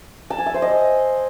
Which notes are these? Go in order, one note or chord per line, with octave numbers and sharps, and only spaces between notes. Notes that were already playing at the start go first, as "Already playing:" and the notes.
A5
G#5
E5
C5
D#5